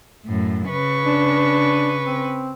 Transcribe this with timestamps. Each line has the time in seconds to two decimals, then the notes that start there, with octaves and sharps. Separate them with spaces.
0.26 F#2 A2
0.69 C#3 B4 C#6
1.05 D4
2.06 C4